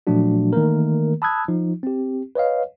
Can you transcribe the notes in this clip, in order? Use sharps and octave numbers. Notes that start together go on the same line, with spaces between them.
A#2 F3 F#3 A3 D4 F#4
D#3 E3 A3 A#3 A#4
A5 B5 D#6 E6 F#6 G#6
F3 D#4
C4 G4
B4 C#5 D#5 F5